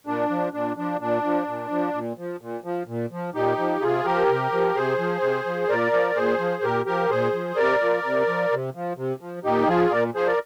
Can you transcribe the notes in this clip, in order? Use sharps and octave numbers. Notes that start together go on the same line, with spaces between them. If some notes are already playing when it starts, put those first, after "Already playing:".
A#2 D4
F3
A#2 D4
F3 D4
A#2 D4
F3
A#2
F3
A#2
F3
A#2
F3
A#2
F3
A#2 D#4 G4
F3
C3 F4 G#4
F3 G4 A#4
C3
F3
C3 G#4 C5
F3
C3
F3
A#2 A#4 D5
F3
A#2 G#4 C5
F3
A#2 G4 A#4
F3 G4 A#4
A#2 G#4 C5
F3
C3 A#4 D5
F3
C3
F3
C3
F3
C3
F3
A#2 D#4 G4
F3 F4 G#4
A#2 A#4 D5
F3 G#4 C5
A#4 D5